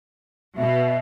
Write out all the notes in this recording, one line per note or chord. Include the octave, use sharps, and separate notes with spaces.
B2 E5